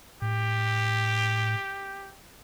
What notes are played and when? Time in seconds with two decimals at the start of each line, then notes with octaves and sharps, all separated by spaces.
0.22 A2 G4